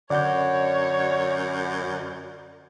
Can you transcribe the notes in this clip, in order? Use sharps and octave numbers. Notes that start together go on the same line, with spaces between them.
F#2 D3 C#5 D5 F#5 G6